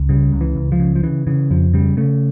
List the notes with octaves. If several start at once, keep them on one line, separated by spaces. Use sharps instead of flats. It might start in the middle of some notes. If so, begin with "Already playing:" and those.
Already playing: C#2
C#3 G3
C#2
E3
C#2
F3
C#3
F3
C#3 E3
C#3 E3
F2 F3
C#3 G3
C#3 A3